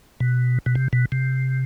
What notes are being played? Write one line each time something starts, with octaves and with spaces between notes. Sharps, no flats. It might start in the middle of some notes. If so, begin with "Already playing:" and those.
B2
B2
C3
B2
C3